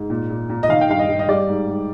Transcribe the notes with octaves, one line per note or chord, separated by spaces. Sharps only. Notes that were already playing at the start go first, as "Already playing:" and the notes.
Already playing: G#2
A#2
A#2
A#2
D#5
D#3 F5
G5
G2 F5
D#5
G2
D#5
G3 D5
G#2
G#2